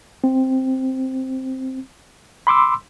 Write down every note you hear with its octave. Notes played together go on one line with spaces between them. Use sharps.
C4
B5 C6 D6 E6